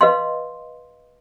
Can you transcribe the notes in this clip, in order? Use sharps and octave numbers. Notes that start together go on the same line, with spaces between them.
B4 D#5 F5 C6